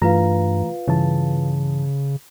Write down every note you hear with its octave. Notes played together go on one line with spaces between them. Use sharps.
G2 E3 A3 F4 B4 F5 A#5
G2 C#3 E3 A5